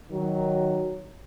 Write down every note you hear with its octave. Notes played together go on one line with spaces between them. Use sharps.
D#3 F#3